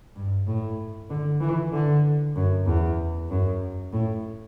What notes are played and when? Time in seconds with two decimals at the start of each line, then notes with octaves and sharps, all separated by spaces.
0.16 G2
0.47 A2
1.10 D3
1.40 E3
1.73 D3
2.36 F#2
2.66 E2
3.29 F#2
3.93 A2